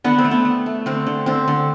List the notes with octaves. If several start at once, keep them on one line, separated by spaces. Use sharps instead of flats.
D3 B3 D4
C4
A3
B3
A3
A3
D3 C4
D3
D3 C4
D3